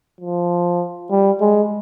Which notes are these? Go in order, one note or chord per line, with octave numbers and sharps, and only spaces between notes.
F3
G3
G#3